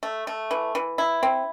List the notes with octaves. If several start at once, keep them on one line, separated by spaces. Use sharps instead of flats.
A3
A3
E3
E3
E4
C4